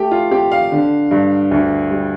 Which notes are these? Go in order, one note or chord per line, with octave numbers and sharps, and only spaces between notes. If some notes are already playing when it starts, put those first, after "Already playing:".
Already playing: A3 G4
F4
C4 G4
F5
D3
G2
D2
G3